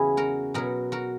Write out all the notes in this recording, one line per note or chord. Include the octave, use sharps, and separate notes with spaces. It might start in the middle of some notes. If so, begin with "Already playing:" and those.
Already playing: E2 C#3 F#3 E4 G#4
F#4 A#4
B2 F#3 F#4 A#4
F#4 A#4